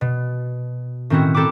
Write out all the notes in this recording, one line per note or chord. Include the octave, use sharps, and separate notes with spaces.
B2
A2 D#3 C4 C#4 E4 F#4
C4 A4 C5 A#5 B5 D6